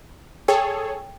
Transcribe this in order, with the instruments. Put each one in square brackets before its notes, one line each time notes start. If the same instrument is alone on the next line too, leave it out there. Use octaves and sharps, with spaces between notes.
[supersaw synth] G#4 A4 C#5 [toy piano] G5